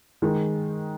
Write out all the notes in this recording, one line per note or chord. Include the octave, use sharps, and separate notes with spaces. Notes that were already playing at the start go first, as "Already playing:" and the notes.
D#3 G#3 D#4